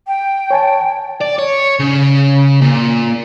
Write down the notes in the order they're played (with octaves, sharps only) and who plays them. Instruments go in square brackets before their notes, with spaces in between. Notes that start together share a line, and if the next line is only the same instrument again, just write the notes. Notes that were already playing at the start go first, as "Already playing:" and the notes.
[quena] G5
[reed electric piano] C#5 G#5 A5
[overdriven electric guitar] D5
C#5
C#3
A#2